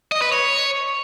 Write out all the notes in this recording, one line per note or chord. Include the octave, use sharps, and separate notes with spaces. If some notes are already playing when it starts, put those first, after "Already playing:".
D#5
B4
C#5